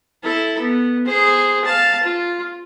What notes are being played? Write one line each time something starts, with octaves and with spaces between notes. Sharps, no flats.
E4 A4
B3
G#4 C5
F5 A5
F4